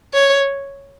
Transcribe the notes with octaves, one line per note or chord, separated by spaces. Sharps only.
C#5